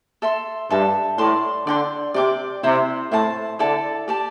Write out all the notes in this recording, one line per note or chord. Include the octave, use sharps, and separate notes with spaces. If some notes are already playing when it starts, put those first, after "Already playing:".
A4 E5 C6
G2 A4 E5 A5
A2 D5 A5 C6
D3 D5 G5 C6
C3 D5 G5 D6
C3 E4 C5 G5
A2 E4 C5 A5
D3 E4 A4 D5 A5
G4 D5 A5